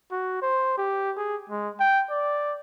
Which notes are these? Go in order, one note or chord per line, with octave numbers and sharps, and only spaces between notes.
F#4
C5
G4
G#4
G#3
G5
D5